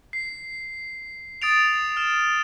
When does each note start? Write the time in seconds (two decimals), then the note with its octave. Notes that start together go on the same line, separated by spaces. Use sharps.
0.13 C7
1.42 D#6 A6 D7 F7
1.97 F6 E7